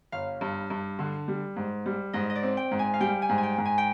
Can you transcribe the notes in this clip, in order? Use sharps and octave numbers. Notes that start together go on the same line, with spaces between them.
G1 F5
G2
G2
D3
G3
G#2
G3
G#2 D#5
D#5
D5
C4
G5
G#2
G#5
F5
G3 G5
G#5
G#2
G#5
G5
G#2
G#5
G5